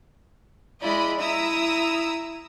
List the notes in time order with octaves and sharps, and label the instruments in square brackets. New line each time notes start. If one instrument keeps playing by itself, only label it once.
[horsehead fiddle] G#3 E4 [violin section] D5 D#5 B5
[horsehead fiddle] E4 [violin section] A#5 D#6 E6